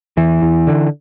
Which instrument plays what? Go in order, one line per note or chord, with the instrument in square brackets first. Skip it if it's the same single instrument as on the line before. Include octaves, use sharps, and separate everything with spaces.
[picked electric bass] E2 E3
E2
D3